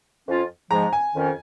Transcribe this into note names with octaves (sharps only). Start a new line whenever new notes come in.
F2 F3 C#4 F4
G#2 F3 G#3 A#5
G#5
F2 D#3 C#4